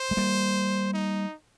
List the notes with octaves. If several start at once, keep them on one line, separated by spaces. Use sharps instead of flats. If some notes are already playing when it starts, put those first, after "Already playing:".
Already playing: C5
G#3
G3 A#3
D#4